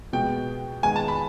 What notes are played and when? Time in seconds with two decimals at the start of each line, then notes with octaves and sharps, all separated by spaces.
0.13 B2 G#3 B3 G5
0.83 D#3 G#3 B3 G#5
0.96 A5
1.08 B5